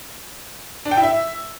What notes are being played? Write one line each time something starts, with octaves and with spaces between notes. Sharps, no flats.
D4
G5
E4
E5